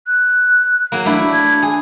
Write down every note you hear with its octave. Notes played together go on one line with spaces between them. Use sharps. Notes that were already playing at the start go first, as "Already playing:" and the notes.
F#6
F#3 A#3
A3 D4 E4
G#6
G#4 G#5